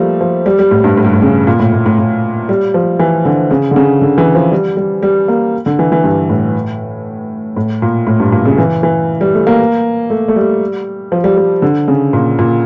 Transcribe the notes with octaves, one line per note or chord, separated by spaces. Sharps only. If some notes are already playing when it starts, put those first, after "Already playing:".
Already playing: F3 G3 A3 A#3
F3
G3
G3
A2
G2
A2
G2
A2
C#3
A#2
A2
A2
A2
A2
G3
F3
E3
D3
C#3
D3
C#3
D3
E3
F3
G3
G3
G3
A#3
D3
E3
E3
G2
A2
A2
A#2
A2
G2
A#2
C#3
E3
E3
G3
A3
A#3
A3
A3
G3
F3
G3
G3
D3
C#3
A#2
A#2